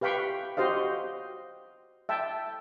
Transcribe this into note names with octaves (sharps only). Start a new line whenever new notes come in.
G4 B4 F5 G5 B5 C#6
F#4 G4 C5 D#5 F5
E5 G5 A5